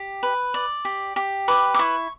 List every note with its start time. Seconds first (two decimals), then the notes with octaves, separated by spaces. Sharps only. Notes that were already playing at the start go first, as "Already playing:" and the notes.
Already playing: G4
0.23 B4
0.54 D5
0.85 G4
1.16 G4
1.48 B4 D6
1.74 D6
1.79 E4 C#6